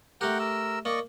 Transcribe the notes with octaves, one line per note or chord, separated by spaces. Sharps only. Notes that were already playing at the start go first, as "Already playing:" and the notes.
A3 G4 A#4 F#5 G5
A#4 E6
A#3 D5 D#5 C#6